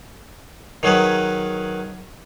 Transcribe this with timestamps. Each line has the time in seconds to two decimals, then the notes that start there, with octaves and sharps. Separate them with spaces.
0.83 D#3 F#3 G#4 B4